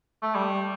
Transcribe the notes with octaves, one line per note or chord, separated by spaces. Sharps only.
A3
G3